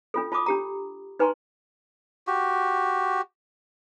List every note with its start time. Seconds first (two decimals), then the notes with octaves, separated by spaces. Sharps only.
0.14 D4 F4 A4
0.32 F4 A5 B5 D6 D#6
0.46 D4 G4 A#5
1.19 D#4 B4 G#5 A#5 C6 C#6
2.27 F#4 G4